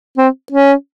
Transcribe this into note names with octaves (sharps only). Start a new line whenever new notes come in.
C4
C#4